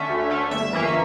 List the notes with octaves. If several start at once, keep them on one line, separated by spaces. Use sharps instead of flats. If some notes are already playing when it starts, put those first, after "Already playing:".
Already playing: D3 A3 C#4 E5
D2
D3 A3 C#4
G1 E5
F2 E3 A#3 C#4